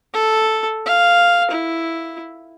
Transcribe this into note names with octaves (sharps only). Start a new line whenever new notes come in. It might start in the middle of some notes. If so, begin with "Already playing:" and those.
A4
F5
E4